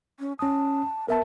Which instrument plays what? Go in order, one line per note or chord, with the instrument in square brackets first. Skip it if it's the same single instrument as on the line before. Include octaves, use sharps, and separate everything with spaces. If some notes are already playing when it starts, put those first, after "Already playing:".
[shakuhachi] C#4
[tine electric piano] C#4 D#6 [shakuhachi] A5
[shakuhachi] B3 [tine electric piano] A#4 E5 A5